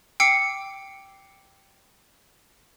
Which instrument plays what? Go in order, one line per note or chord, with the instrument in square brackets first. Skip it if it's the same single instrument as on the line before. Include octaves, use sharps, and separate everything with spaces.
[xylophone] G5 D6 E6 C7 C#7